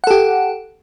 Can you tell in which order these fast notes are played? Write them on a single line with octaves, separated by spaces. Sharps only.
F#5 A4 G4